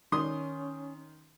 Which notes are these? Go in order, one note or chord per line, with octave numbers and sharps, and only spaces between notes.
D#3 C#4 C6 D#6